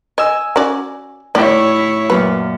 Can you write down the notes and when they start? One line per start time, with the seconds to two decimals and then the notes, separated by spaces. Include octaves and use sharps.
0.18 D#5 G#5 E6
0.56 C#4 F#4 D5
1.35 A2 E4 C#5 D5
2.10 F#2 A#2 B4